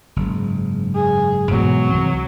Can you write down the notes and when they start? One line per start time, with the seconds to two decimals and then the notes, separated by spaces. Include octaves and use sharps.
0.16 F#1 G#2
0.95 G#4
1.51 G#2 B2 E3 F#3
1.89 C2 E3 C4